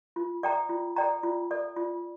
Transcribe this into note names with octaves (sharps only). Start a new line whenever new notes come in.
F4
A4 D5 G5 A#5
F4
A4 D5 G5 A#5
F4
A4 D5
F4